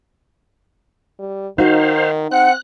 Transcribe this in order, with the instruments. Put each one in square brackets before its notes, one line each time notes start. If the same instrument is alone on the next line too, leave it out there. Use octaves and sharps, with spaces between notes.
[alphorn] G3
[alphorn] D#3 [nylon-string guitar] D#4 F#4 [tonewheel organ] C5 F5
[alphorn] C4 [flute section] F#5 [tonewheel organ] F#6